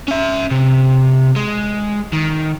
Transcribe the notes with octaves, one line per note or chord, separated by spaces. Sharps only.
C#4 E5
C3
G#3
D#3